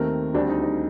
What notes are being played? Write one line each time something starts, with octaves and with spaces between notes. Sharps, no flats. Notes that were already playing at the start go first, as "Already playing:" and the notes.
Already playing: D#2 D#3 A3 C4 A#4
D2 D3 G3 C4 D4
D#4
D#4